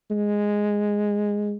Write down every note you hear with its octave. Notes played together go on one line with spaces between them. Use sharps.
G#3